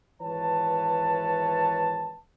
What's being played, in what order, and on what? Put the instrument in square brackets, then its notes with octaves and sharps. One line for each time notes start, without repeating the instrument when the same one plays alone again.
[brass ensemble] G#1 E3 B4 C#5 A5